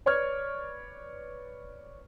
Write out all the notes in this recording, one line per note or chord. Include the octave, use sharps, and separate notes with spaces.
B4 C#5 D5 C#6 F6 G#6